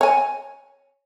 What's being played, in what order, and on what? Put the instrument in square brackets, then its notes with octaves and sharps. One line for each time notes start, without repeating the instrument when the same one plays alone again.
[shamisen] C#5 G#5